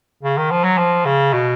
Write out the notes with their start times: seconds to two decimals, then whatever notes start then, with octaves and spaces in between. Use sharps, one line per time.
0.23 C#3
0.38 D#3
0.51 F3
0.64 F#3
0.78 F3
1.05 C#3
1.33 B2